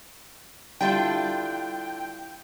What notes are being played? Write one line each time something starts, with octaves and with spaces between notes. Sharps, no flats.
D3 G3 D4 E4 F4 G5